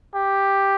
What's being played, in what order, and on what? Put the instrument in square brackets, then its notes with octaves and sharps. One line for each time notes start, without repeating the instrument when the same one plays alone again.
[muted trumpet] G4